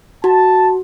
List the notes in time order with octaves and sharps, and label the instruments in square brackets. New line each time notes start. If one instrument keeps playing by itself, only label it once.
[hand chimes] F#4 [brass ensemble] A5